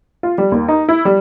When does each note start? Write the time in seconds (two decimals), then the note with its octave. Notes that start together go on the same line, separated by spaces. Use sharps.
0.23 F4
0.38 G3
0.52 D#2
0.68 D#4
0.88 E4
1.05 G3